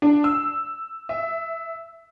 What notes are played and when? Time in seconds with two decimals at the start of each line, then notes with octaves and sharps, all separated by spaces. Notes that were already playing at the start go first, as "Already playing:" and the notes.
0.02 D4
0.24 E6
1.09 E5